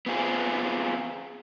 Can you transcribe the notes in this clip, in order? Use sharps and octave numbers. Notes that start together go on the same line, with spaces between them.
B3 C4 F4 G#4